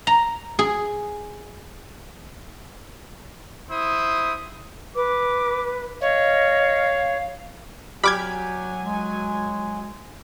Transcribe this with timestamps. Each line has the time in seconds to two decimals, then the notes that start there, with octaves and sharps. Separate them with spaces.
0.07 A#5
0.59 G#4
3.70 E4 C5 D#6
4.96 B4 D6
6.01 C#5 D#5 F5
8.03 F#3 G4 D5 G#5 B5 D6 F6 G#6
8.82 G#3